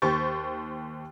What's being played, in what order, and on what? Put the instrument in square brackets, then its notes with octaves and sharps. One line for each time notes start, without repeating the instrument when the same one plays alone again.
[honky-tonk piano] D#2 G4 C5 C#6 A6